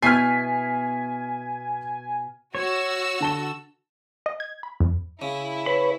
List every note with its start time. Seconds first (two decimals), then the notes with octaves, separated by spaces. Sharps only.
0.02 B2 E4 G#5 F6 G6 B6 C7
2.55 F#4 C#5 E6
3.20 D3 A5 G7
4.26 D#5
4.40 G#6
4.63 B5
4.80 F2
5.22 C#3 E4
5.66 B4 C#5 B5